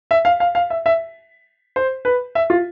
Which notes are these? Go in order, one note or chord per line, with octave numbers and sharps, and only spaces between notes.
E5
F5
F5
F5
E5
E5
C5
B4
E5
F4